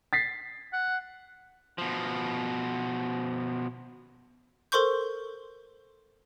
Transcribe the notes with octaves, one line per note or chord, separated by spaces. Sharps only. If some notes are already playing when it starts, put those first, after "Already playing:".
A6 B6 C7
F#5
B2 F3
A4 A#4 C5 C6 C#6 G6